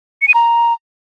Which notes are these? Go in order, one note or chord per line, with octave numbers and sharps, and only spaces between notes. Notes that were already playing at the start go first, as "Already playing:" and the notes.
C#7
D#7
A#5